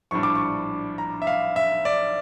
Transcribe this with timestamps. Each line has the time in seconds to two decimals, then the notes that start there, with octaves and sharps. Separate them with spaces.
0.11 A#1 A2 G3 D4 C#6
0.23 D6
0.35 C#6
0.98 A#5
1.22 E5
1.27 F5
1.56 E5
1.85 D5